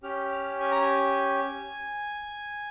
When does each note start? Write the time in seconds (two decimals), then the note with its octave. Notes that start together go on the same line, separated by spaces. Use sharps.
0.03 C#4 G4 F6
0.31 F6
0.60 G#5
0.71 A#5
0.82 G#5